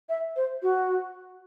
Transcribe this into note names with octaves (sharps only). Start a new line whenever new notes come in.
E5
C5
F#4